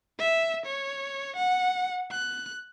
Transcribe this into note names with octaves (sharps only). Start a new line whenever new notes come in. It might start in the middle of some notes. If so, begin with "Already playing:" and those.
E5
C#5
F#5
F#6